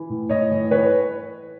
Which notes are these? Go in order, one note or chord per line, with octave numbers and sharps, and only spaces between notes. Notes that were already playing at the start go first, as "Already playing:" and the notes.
Already playing: E3
A2
A2 C#5 D#5
E3
E3 B4 C#5